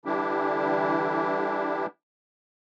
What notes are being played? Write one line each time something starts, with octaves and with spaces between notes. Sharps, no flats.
D3 E3 G3 D4 E4 G4